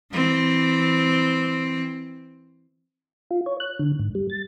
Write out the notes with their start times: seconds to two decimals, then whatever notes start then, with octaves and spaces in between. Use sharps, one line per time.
0.11 E3 C4
3.31 F4
3.46 C#5
3.60 F#6
3.79 D3
3.99 G#2
4.15 G3
4.30 A6